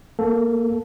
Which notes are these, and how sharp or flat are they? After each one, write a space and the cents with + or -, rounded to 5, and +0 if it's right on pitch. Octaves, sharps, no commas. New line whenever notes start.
A#3 +0 A4 +0